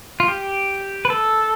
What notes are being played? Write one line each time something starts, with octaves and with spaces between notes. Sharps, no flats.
F4
G4
B4
A4